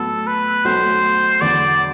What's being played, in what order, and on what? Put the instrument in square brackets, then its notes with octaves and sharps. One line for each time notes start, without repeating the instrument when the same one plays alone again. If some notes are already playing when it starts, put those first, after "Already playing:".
Already playing: [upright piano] A2 F#3 B3 F#4 [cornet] A4
[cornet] B4
[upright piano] B1 B2 A3 [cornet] C5
[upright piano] E2 D3 F#3 B3 [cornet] D5